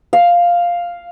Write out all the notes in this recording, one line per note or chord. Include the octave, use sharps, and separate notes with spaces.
F5